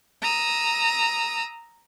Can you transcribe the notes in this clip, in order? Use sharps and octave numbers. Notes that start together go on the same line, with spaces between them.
A#5 D#6 E6